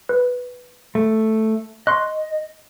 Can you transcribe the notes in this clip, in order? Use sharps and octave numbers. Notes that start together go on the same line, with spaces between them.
B4
A3
D#5 C6 C#6 F#6